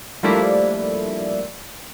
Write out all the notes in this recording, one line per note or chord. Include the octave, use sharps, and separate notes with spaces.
F3 G3 A3 A#3 D4 E4